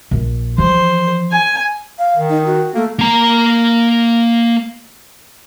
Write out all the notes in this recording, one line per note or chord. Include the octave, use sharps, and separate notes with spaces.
A#1
E3 F3 C5
G#5
F5
D#3
D#4
F#4
A3 A#3
A#3 A#5